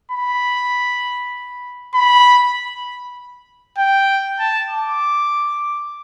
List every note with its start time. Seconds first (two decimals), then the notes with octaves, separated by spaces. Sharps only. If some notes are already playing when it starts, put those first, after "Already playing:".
0.12 B5
1.94 B5
3.78 G5
4.39 A5
4.71 D6